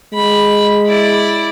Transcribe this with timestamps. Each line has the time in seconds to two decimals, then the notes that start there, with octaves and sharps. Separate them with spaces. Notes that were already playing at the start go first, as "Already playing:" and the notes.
0.13 G#3 B5
0.87 E4 D5